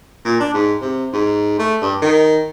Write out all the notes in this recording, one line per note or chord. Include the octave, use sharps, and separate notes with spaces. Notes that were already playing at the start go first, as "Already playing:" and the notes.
A#2
D4
G#2
C3
G#2
A3
G2
D#3